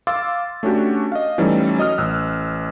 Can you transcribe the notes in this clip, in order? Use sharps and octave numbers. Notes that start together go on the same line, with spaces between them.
F5 C6 D6 E6 A6
A3 C#4 D4 F#4 G4
D#5 F5
E3 G3 A3 C#4 D#4 A4
F#3 D#5 D#6 F6
A1 E6 F#6